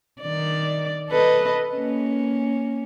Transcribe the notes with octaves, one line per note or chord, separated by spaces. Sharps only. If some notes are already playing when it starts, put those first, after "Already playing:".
D#3 D5
A4 B4 D#5
A#3 C#4